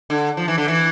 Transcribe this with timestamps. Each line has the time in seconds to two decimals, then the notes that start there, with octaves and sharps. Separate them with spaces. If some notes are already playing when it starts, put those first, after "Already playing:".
0.10 D3
0.37 F3
0.48 E3
0.58 D3
0.68 E3